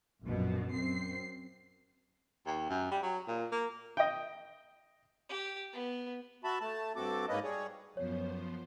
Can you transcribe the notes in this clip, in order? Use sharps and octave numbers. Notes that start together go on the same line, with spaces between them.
A#1 F#2 B2
F#2 C4 C7
D#2
F#2
G3
F#3
A#2
A#3
D#5 G5
G4
B3
F#4 E5 A5 B5
A3 A5
G2 C4 F#4 A4 D6
G#2 A#3 C#4 B4 D#5
G3 G#4 C#5
F#2 F3 B3 C5 C#5